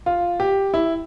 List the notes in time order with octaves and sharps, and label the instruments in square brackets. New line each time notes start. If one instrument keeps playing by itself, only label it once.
[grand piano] F4
G4
E4